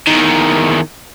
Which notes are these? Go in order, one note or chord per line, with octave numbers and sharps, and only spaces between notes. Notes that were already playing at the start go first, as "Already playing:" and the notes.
E2 D#3